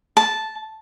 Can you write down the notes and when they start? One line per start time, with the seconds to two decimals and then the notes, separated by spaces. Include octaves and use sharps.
0.17 A5